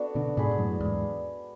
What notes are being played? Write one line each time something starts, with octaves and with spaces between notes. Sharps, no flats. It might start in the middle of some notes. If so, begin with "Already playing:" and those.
Already playing: B3 D4 F#4 A4
B2 D3
G#2 B2 D4 G#4 B4
G#2
F#2 A2
E2 G#2